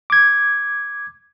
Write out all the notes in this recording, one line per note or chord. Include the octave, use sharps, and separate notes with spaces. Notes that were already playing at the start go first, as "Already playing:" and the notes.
D6 G#6